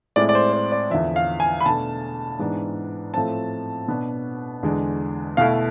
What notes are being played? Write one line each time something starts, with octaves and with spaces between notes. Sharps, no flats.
A2 G#3 C4 E4 D5
D5
C5
C5
D5
E2 D3 F3 E5
F5
G#5
B5
B2 A3 D4 A5
G#2 E3 G#3 B3 D4
A2 F3 A3 C4 A5
B2 B3 D4
E2 D3 G#3 D4
B2 A3 E4 F5